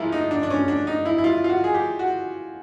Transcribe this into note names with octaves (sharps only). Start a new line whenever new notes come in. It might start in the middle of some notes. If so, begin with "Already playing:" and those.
Already playing: G#2 F3 A#3 E4 F4
D#4
D4
D4
C#4
D4
D#4
E4
E4
F4
F4
F#4
G#4
G4
F#4